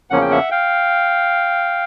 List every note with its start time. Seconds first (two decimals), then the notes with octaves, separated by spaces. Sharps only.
0.10 E2 C#3 F3 A#3 C#4 F#5
0.22 G5
0.31 E5 F#5
0.51 F5 G5